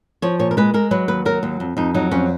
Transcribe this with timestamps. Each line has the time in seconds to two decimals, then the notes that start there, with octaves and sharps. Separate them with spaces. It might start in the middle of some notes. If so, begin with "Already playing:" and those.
0.22 F3 C#5
0.39 A#2 C#5
0.51 A#4
0.57 G#3 B4
0.74 G#3 A#4
0.91 F#3 B4
1.08 D#2 B4
1.25 F#3 A#4
1.43 D#2
1.60 F2
1.77 F2 D#4
1.94 F#3 D#4
2.11 F2 C#4